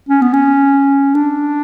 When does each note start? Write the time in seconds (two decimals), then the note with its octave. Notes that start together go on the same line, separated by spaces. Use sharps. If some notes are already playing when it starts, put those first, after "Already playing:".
0.09 C#4
0.21 B3
0.33 C#4
1.14 D4